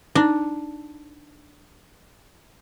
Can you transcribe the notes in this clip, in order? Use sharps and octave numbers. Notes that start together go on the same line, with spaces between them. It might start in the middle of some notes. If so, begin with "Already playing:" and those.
D4 D#4